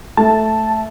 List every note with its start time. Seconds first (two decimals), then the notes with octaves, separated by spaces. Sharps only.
0.17 A3 A5